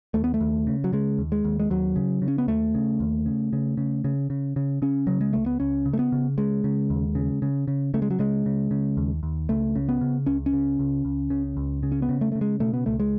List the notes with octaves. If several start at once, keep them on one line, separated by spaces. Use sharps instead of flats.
D#2 A3
B3
A3
D#2
C#3
F#3
C#3 G#3
D#2
G#3
D#2
G#3
D#2 F#3
C#3
C#3
C#4
B3
D#2 A3
C#3
D#2
C#3
C#3
C#3
C#3
C#3
C#3
C#3 C#4
C#3 F#3
G#3
C#2 A3
B3
C#2 C#4
C#3
A3
B3
C#3
C#3 G#3
C#3
D#2
C#3
C#3
C#3
C#3 A3
G#3
F#3
C#3 G#3
C#3
C#3
D#2
D#2
C#2 A3
C#3
B3
C#3
C#2 C#4
C#4
C#3
C#2
C#2
C#3
C#2
C#3
C#4
B3
C#3
A3
C#3 A3
G#3
B2 A3
B3
C#2 A3
G#3